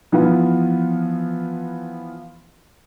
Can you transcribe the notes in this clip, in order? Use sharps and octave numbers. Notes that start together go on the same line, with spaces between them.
E3 F3 B3 F4